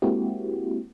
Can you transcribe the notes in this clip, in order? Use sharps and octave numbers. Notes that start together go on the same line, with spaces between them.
G#3 A#3 C4 E4 F#4 G4